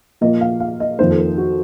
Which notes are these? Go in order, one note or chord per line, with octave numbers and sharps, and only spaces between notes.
A#2 F3 A#3 D#5
F5
F5
D#5
F2 D#3 A#3 C5
A4
A#4
F#4